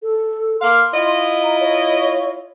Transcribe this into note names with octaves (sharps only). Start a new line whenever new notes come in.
A4
A#3 F5 C6
E4 F4 D#5
A#5
C#5